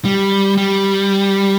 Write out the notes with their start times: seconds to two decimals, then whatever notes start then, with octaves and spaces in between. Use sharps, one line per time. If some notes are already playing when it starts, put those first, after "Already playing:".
0.05 G3
0.57 G3